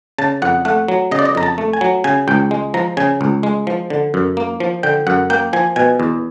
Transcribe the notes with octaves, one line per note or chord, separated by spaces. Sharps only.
C#3 A5
F2 F#5
A3 F#5
F#3
C#3 D#5
D5
D#5
F2 A#5
A5
A3
G#5
F#3
C#3 G#5
C#2 G5
G#3
F3 A#5
C#3 G#5
C#2
G#3
F3
D3
F#2
A#3
F3
D3 G5
F#2 F#5
A#3 G5
F3 G#5
B2 G#5
E2